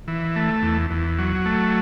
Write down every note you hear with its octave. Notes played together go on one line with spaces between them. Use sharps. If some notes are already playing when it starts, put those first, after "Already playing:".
E3
A3
E2
E2
F#3
A3